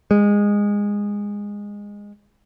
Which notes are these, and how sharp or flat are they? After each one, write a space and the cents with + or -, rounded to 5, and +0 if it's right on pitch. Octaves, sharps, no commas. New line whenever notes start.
G#3 -20